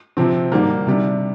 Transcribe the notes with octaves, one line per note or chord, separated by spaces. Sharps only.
C3 F3 C4
G#2 D#3 G3 A#3
C3 G3 D4